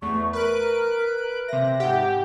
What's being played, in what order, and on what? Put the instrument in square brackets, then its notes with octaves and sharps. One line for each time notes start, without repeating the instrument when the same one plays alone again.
[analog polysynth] E2 A3 [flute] C#6
[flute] A#4 [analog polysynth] B4 F#6 D7
[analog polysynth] C3 A#6 [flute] E5
[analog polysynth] G#2 G4 [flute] F#5